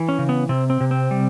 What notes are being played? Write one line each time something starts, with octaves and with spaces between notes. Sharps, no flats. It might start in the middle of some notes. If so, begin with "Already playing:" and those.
Already playing: E3
C#4
C#3
B3
C3 C4
C4
C3
C4
G3